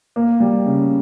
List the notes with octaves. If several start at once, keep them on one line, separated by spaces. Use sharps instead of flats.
A#3
G3
C#3